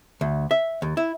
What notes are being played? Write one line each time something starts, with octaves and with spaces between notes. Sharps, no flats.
D2
E5
D#2
E4